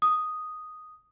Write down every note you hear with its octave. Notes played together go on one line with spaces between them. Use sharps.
D#6